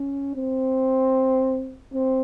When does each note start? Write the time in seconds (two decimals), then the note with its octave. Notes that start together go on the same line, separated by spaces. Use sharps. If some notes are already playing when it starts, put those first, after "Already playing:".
Already playing: C#4
0.36 C4
1.93 C4